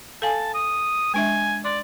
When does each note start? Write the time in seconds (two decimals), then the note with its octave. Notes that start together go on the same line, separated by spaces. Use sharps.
0.22 A4 F5 G#5 A5
0.54 D#6
1.14 G#3 D4 E5 G#5
1.65 D5 C6